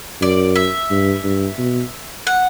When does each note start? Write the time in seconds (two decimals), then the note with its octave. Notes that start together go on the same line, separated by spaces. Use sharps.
0.21 F#2 D5
0.56 E5
0.91 G2
1.24 G2
1.58 B2
2.27 F#5